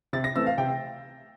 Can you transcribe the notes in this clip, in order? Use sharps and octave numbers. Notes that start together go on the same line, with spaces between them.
C3 A6
A#6
E3 A3 C4 E6
F5
C3 G5